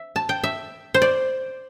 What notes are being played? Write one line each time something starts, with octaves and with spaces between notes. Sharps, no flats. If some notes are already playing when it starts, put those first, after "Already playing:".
Already playing: E5
A5
G5
E5
C5
D5